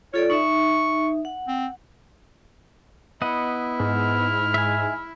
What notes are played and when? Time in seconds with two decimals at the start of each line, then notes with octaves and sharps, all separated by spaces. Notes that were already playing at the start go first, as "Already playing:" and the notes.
0.14 F4 A4 C#5 D5
0.30 D#4 E5 C#6
1.25 F#5
1.48 C4
3.22 B3 E4 D#5 F#5
3.80 G#2 F6
4.54 E5 G#5